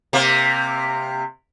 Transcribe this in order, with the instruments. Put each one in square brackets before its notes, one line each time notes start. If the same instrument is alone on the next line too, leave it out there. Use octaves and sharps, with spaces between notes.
[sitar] C3 A#3